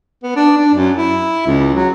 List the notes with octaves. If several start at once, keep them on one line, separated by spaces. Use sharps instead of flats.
B3
D4
D4
F#2
E4
C#2
F#3